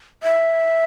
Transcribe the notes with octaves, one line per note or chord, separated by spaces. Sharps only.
E5